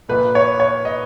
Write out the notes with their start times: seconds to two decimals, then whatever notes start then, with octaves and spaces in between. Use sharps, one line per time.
0.09 A#1 A#2 B4
0.35 C#5
0.60 C#5
0.85 D#5